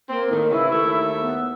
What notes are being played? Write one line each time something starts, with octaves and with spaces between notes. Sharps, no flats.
A#3 C4
A2 D#3
C#3 E3 E4
D#2 A3 E5
B3